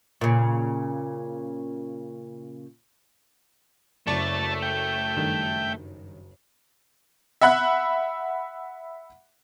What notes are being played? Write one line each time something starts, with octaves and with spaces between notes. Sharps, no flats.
A#2 C#3
F#1 F#2 A3 D5 A5 C#6
G5
G2 D#3
E5 F#5 B5 F#6